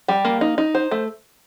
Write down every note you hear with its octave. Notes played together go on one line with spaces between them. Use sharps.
G3
A#3
D#4
D#4
C5
A3